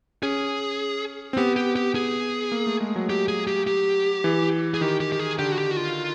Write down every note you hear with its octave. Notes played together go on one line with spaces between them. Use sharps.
C#4 G#4
C4
B3 G4
G4
G4
G#4
A#3
A3
G#3
F#3
G4
G#4
G4
G4
E3
G#4
D#3 G4
G4
G4
G#4
D3 G4
F#4
G4
F#4
F4